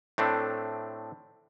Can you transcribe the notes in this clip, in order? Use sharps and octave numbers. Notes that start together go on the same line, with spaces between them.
A2 A3 C4 D4